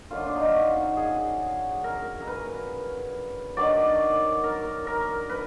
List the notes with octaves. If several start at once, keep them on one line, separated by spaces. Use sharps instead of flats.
F#2 D3 F#3 D4 F4
D4
D#4
F4
F#4
G#4
A#4
A#4
B4
D#3 F#3 D4 D5
A#4
A#4
B4